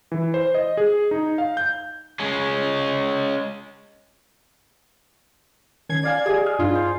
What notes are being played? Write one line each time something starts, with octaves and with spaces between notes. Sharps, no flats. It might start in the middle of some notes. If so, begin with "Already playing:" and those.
E3
C5
D#5
G#4
D#4
F5
G6
G#3 C#4
D#3 C#4 G#6 C7
D5 F5 G#5
G4 G#4 D#5
D#6 F6
G2 D4 D#4 F4
C5